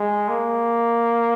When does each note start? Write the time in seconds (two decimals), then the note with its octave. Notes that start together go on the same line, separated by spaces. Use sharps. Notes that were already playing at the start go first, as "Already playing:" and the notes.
Already playing: G#3
0.29 A#3